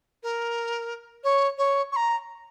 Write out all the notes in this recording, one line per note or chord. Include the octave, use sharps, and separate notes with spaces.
A#4
C#5
C#5
C#6
A#5